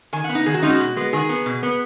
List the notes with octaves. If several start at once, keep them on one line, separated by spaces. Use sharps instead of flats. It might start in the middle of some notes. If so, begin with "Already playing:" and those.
D#3 G#5
F#5
B3
D#4
D#3 G#4
F#4
G#3 C#4 D#4
F#4
B2
G#3 B3
D#3 G#4
B3
B2
B3